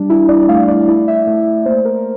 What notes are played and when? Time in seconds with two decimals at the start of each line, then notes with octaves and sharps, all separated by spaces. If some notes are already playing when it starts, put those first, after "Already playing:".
Already playing: G3 D4
0.10 E4
0.29 D5
0.48 A3 F5
0.68 D5
0.88 E4 D5
1.08 E5
1.27 A3 E5
1.66 A#3 C5
1.85 A#4